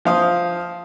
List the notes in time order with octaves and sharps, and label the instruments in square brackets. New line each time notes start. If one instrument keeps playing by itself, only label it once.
[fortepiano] F3 F5 D#6